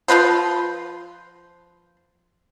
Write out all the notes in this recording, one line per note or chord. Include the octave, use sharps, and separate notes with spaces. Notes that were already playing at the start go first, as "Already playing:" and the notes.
F3 F4 B4 C5